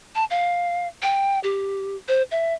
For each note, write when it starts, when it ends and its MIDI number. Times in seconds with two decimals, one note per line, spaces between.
0.15 0.25 81
0.30 0.88 77
1.02 1.39 79
1.44 1.96 67
2.08 2.23 72
2.31 2.54 76